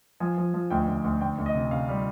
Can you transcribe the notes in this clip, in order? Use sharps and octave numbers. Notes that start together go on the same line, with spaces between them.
F3 G#5
F3
F3
D2 G5
D2
D2
D2 G5
D2
D#5
C3
C3 F5
G3